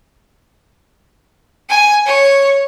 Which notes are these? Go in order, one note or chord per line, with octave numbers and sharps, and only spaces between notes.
G#5
C#5